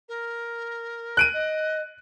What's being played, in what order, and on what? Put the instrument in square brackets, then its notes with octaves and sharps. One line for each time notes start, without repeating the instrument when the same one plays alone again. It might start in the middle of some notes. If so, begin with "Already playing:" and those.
[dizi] A#4
[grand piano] F#6 D7 D#7
[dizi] D#5